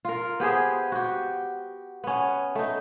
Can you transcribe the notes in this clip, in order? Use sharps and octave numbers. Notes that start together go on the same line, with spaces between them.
F4 A#4
B3 G4 G#4 C5
F#4 G4
B3 C#4
A3 D#4